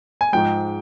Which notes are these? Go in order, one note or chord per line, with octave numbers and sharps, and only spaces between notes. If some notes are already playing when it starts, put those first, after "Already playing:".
G#5
G#2 F3 G#3 G5